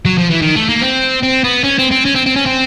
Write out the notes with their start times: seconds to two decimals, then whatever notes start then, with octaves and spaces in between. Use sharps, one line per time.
0.05 F#3
0.18 F3
0.30 E3
0.42 D#3
0.56 A3
0.69 A#3
0.82 C4
1.23 C4
1.44 B3
1.64 C#4
1.79 C4
1.91 C4
2.05 C#4
2.15 C4
2.26 C4
2.36 C#4
2.46 C4